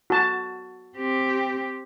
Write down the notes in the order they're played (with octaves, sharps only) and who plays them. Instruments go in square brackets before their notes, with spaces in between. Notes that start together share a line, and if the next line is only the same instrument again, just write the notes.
[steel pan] F#4 A5
[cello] C4 G4